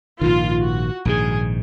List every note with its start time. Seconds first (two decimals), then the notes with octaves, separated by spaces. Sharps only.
0.21 A#1 G#2 D#3 F4
0.63 F#4
1.05 A#1 G#2 D#3 G#4